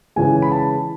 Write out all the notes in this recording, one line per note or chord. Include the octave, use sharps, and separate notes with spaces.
C#3 E3 G#3 G#5
B5
A5